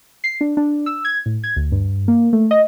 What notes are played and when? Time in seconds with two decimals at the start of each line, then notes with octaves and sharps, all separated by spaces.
0.24 C7
0.41 D4
0.57 D4
0.86 E6
1.05 G#6
1.26 A2
1.44 G#6
1.56 D2
1.72 G2
2.08 A#3
2.33 A3
2.51 D#5